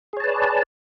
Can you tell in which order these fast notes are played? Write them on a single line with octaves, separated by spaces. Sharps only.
G#4 C#5 A5 B4 D5